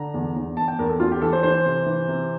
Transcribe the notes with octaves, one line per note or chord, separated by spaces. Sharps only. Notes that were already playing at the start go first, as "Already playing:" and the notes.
Already playing: D3 A#5
E2
E2
E2 A5
G5
E2 A#4
A4
E2 F4
G4
E3 A4
C5
E3 C5
C3
E3
C3